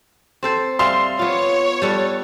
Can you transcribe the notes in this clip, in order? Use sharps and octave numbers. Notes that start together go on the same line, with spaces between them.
C4 A4 C5
G3 E5 F5 C6
B3 F4 C#5
G3 A4 B4